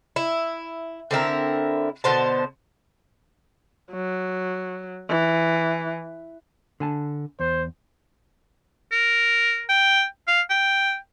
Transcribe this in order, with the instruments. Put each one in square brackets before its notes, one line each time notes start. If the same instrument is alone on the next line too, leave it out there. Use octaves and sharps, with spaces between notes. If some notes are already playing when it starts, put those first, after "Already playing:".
[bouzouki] E4
D3 C4 E4 A#4
B2 D3 C5 A5
[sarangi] F#3
E3
[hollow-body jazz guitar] D3 G#5 A5
[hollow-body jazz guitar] E2 [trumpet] C5
[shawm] A#4
G5
F5
G5